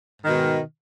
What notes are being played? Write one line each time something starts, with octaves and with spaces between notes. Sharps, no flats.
G#2 B2 D#3